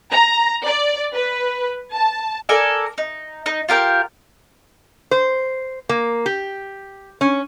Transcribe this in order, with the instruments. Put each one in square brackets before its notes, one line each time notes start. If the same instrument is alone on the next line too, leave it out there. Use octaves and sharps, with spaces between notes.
[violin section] A#5
D5
B4
A5
[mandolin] A4 A#4 D5 G#5
D#4
D#4
F4 G4 A#4 G5
[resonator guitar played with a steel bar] C5
A#3
G4
C#4